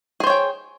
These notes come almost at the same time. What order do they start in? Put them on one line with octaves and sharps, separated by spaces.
G#4 C5 C#5 G5